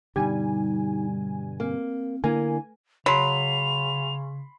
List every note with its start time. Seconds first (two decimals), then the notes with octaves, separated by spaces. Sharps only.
0.16 G2 B2 D3 G3 D#4 G#5
1.60 A#3 C4
2.24 D3 A#3 D4 E4 G#5
3.06 C#3 F#3 B5 C6 F7